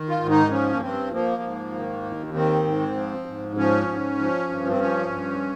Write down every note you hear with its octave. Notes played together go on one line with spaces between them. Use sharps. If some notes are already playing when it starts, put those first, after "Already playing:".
Already playing: D#3
F4
G#2
D#4
F3 C#4
A#3
G2 C4
F3 A#3
G#2
D#3
D#2
D#3 C4
G#2
F3
G#2
F3 C#4
G#2
F3
G2
C4
F3 C#4
G2